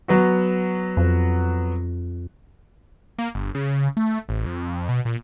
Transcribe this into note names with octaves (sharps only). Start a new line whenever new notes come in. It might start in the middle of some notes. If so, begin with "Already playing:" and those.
F#3 B3 F#4
F2
A#3
G1
C#3
A3
A1
F2
B2
A#2